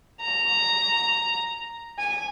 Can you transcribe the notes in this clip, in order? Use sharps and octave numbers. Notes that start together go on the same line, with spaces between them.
A#5
G#5